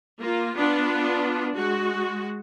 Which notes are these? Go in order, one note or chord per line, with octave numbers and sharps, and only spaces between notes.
A#3 F4
B3 D4 F4
G#3 F#4